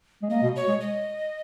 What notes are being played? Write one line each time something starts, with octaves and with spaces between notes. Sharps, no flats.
G#3
A#3 D#5
B2
C#5
G#3
D#5